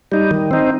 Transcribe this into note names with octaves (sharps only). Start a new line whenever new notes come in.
G3 D#4
D#3
C4 D#4